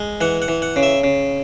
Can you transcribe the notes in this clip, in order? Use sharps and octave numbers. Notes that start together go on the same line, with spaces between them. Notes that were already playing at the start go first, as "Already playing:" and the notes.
Already playing: G#3
E3 F#5
F#5
E3
F#5
C#3
E5
C#3